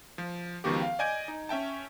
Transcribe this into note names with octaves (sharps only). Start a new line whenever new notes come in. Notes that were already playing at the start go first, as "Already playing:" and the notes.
F3
C#2 D#3 F3 B3 F#4 G4
F5 G5
D5 D#5 G#5 G6 G#6 D7
D#4
C#4 E5 G5 A5